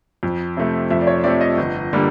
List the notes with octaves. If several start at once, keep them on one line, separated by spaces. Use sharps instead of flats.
F2
C3 F3 A3
F2 E5
D5
C#5
C3 F3 A3 D5
D#5
G1
D3 G3 A#3